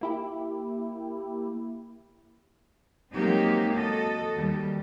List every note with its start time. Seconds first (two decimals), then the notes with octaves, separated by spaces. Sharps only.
0.01 A#3 E4 G4
3.12 F#3 G#3 A#3 C4 D#4 G4
3.74 F#4 A4 D#5
4.34 D#2 G3